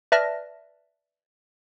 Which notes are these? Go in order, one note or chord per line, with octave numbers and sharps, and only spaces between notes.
B4 D5 E5 A5 F6 A#6